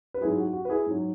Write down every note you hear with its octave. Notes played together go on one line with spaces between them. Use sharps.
B4
G#2 F#3 E4 G#4
F#4
F#4
B4
E4 G#4
G#2 F#3